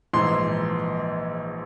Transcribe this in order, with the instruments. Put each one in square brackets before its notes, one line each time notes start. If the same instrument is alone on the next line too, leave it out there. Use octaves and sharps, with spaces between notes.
[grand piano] A#1 G#2 E3 C6